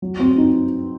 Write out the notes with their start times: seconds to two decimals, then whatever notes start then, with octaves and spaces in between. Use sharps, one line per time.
0.02 F#3
0.20 C4
0.37 D#4